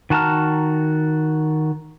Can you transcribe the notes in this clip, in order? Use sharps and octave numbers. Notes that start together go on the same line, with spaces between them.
D#3 F#4 A5 A#5 F6